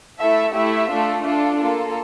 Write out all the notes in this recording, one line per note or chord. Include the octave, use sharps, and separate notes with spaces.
A3 E4 A4 E5
A3 E4 G4 E5
A3 D4 F4 A4
D4 F4 A4
A#3 F4 A4